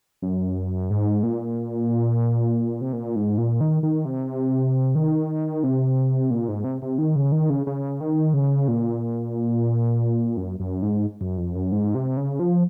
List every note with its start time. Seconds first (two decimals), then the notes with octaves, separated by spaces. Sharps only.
0.22 F#2
0.90 G#2
1.23 A#2
2.81 C3
2.93 A#2
3.16 G#2
3.38 A#2
3.61 D#3
3.83 D#3
4.05 C3
4.95 D#3
5.63 C3
6.31 A#2
6.48 G#2
6.64 C3
6.82 C3
6.98 D#3
7.16 C#3
7.32 D#3
7.50 C#3
7.67 C#3
8.01 D#3
8.33 C#3
8.68 A#2
10.37 F#2
10.60 F#2
10.82 G#2
11.21 F#2
11.37 F2
11.55 F#2
11.72 G#2
11.95 C3
12.17 C#3
12.39 F3